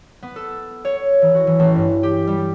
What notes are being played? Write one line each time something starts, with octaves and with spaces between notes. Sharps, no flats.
B3
A4
C#5
E3
F#4
E3
A1
G2
G4
G3